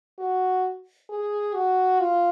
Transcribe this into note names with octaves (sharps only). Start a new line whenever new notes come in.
F#4
G#4
F#4
F4